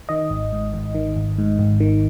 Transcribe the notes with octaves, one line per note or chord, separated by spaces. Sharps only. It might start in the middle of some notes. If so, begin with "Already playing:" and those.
D#3 D#5
G#1
G#2
G#1
D#3
G#1
G#2
G#1
D#3